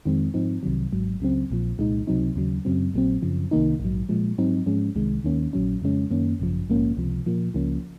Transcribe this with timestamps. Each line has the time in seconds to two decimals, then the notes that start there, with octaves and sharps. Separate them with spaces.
0.05 F2 D#3 G#3 C4
0.34 G#2 F3 C4 D#4
0.63 C2 C3 D#3 F#3
0.92 G#1 G#2 F#3
1.20 C#2 C#3 F#3 C4
1.50 A#1 A#2 F3
1.79 C2 A#2 G#3 D#4
2.07 C#2 C3 F#3 C4 D#4
2.36 D#2 C#3 F#3
2.65 F#2 C#3 F#3 C4
2.94 A#1 A#2 F#3 C4
3.22 F#2 C#3 F3
3.51 C2 C3 D#3 A#3 D#4
3.80 A#1 G#2 F#3
4.09 A#2 F3 G#3
4.38 G#2 F#3 C4 D#4
4.66 G#2 F3 G#3 C#4
4.95 C2 C3 D#3 G#3
5.24 D#2 D#3 A#3 C#4
5.53 A#1 A#2 F#3 C#4
5.82 F2 C#3 G#3 C#4
6.11 F#2 D#3 A#3 C#4
6.40 G#1 F#2 C#3 F3
6.68 A#1 G#2 F3 A#3 C#4
6.97 C#2 C3 F3
7.26 A#2 F3 A#3
7.54 C#2 C#3 F3 A#3 C#4